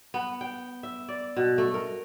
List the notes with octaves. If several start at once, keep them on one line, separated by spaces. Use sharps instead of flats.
B3
G5
E5
D5
B2
A3
A#4